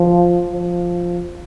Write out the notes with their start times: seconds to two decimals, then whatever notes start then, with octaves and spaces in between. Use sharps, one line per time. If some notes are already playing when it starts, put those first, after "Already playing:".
Already playing: F3
0.52 F3